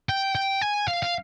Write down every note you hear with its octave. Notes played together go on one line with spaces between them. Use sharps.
G5
G5
G#5
F5
F5